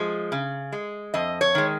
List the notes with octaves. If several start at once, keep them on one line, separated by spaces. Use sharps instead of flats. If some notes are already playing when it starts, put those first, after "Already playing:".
Already playing: F3 G#3
C#3
G#3
F2 D#5
C#5
D#3 G#3